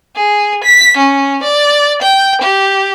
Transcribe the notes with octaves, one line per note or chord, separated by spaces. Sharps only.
G#4
B6
C#4
D5
G5
G4